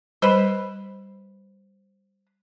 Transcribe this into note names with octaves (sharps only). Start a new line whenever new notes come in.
G3 B4 C5